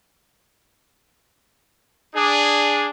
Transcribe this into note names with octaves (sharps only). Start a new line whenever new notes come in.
D4 G#4